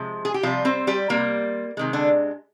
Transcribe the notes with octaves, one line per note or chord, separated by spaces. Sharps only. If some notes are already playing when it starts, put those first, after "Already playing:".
Already playing: C3 F3 G#3
G#4
G4
C3 F3 G3 F4
C4 C5
G3 G4
C3 G3 A#3
C3 D#3 G#3
D3 D4